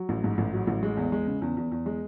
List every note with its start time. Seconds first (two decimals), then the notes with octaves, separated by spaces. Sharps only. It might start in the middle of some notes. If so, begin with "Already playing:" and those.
Already playing: F#3
0.09 A1
0.24 G#2
0.38 A1
0.53 F#3
0.67 A1
0.83 G#3
0.97 E2
1.12 G#3
1.27 C#3
1.42 E2
1.57 E2
1.72 E2
1.86 G#3